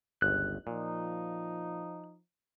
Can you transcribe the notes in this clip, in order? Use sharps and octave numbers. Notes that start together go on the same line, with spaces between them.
G1 C#2 F#6
A#2 F3 D#4